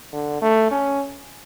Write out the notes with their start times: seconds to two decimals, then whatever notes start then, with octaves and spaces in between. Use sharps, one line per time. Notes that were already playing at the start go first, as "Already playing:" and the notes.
0.13 D3
0.41 A3
0.71 C#4